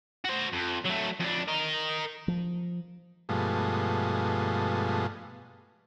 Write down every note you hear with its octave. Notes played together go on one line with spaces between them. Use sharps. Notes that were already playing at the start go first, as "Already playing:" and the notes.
F#4 C5
F2
F#3 A3
F2 D4
A#4 D#5
F3
G2 B2 F3 G#3 A3